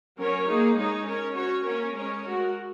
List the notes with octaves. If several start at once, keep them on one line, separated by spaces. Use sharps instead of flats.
F#3 C#4 A#4 C#5
A#3 D#4 G#4
G#3 D#4 G#4 C#5
C#4 A#4 C#5
C#4 F#4 C#5
A#3 C#4 A#4 C#5
G#3 C#4 A#4 C#5
G#3 F#4 A#4